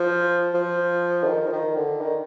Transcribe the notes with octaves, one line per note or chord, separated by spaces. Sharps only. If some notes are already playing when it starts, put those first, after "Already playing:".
Already playing: F3
F3
D3
D#3
F3
D#3
D3
D#3